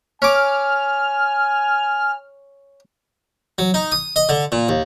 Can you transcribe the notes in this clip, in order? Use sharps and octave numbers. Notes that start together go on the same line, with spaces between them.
C#4 G#5 D6 F6
F#3
D#4
D#6
D#5
D3
A#2
D#2